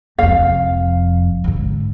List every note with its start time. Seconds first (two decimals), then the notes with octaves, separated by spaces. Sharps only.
0.19 F1 F2 F5
1.44 G#2 D3